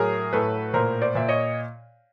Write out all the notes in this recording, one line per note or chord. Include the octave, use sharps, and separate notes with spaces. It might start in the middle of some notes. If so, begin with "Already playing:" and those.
Already playing: A2 F#3 G#4 A#4
A2 A4 B4
A#2 A#4 C5
C5 D5
A#2 E5
C#5 D#5